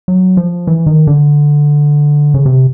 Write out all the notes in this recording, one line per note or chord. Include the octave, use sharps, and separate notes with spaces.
F#3
F3
E3
D#3
D3
C#3
C3